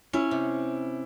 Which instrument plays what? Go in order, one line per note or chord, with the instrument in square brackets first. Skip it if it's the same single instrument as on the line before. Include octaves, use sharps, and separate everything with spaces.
[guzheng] C#4 [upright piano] E4
[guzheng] C3